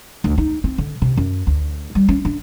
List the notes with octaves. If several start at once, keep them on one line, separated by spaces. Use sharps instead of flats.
D2
D#4
C4
D3
C3
F#2
D2
G3
C#4
D4